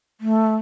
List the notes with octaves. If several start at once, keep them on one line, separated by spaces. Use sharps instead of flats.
A3